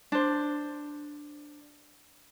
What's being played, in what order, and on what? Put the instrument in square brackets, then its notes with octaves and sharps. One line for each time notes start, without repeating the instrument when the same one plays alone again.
[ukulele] D4 C5